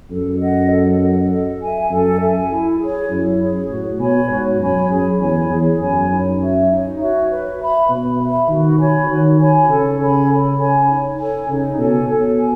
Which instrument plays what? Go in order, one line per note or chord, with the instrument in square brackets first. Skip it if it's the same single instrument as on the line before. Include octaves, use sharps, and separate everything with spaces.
[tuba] F#2 [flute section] A4
[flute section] D#5 F#5
A4
D#5 F#5
A4
E5 G#5
[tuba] F#2 [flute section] A4
[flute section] E5 G#5
E4
G#4 C#5
[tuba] F#2 [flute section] E4
[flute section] G#4 C#5
[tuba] A2 [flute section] F#4
[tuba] B2 [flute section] C#5 G#5 B5
[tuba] G#2 [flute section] F#4
[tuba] F#2 [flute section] C#5 G#5 B5
[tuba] F#2 [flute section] G#4
[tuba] E2 [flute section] C#5 G#5 B5
[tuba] E2 [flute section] G#4
[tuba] F#2 [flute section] C#5 G#5 B5
[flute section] D#4
F#4 C#5 E5
D#4
F#4 C#5 E5
B4
E5 B5
[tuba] B2 [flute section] B4
[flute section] E5 B5
[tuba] D#3 [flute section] F#4
[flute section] C#5 G#5 B5
[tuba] D#3 [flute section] F#4
[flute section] C#5 G#5 B5
[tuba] C#3 [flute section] A4
[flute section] C#5 G#5 B5
A4
C#5 G#5 B5
D#4
A4 C#5 G#5
[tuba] C#3 [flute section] D#4
[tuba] B2 [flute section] A4 C#5 G#5
[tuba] B2 [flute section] A4
[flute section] G#5